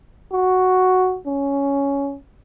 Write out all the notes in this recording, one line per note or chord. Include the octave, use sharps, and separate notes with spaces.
F#4
C#4